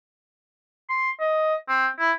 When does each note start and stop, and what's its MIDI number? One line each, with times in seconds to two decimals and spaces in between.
0.89 1.11 84
1.20 1.55 75
1.69 1.87 60
1.99 2.12 64